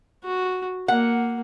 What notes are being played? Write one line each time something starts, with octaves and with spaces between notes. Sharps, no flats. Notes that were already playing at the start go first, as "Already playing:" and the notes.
F#4
A#3 F#5